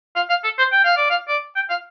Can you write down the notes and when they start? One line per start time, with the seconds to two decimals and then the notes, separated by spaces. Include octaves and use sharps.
0.16 F5
0.30 F5
0.44 A4
0.58 C5
0.72 G5
0.85 F5
0.97 D5
1.10 F5
1.29 D5
1.56 G5
1.70 F5